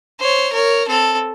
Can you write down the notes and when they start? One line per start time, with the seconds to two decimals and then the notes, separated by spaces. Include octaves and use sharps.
0.20 C5 C#5
0.52 A#4 C#5
0.88 C4 A4